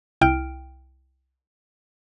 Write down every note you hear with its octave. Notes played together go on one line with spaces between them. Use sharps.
C2 E4 G5 F6 D7